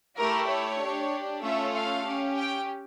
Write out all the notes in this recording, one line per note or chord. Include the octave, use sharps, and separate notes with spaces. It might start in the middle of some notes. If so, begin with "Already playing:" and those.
A3 E4 G4 A#4
C#5
D4 G4
A3 C#4 F4 A4 E5
F5
C#4 G4
G5